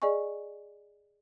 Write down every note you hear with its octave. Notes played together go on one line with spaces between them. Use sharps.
G#4 D5 D#5 G#5 C#6